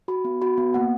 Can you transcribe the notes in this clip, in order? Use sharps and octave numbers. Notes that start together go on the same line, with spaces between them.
F#4 B5
B3
F#4 B5
B3
A#3 F#5